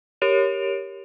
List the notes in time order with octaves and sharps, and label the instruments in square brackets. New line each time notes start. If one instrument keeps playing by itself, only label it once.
[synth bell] G4 A#4 C#5 D7 F7